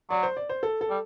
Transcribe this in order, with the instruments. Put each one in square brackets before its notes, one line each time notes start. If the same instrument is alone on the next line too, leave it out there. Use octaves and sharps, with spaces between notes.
[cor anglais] F#3 [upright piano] D5
[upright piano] C5
D5
C5
A4
A4
[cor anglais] G3